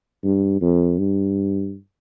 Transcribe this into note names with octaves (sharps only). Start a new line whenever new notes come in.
G2
F2
G2